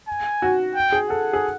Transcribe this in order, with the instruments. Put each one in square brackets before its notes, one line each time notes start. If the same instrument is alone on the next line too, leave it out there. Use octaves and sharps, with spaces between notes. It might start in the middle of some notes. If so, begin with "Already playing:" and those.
[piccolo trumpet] G#5
[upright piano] F#4
[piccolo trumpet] G5
[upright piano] G#4
[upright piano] A4 [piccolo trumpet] F#5
[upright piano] G#4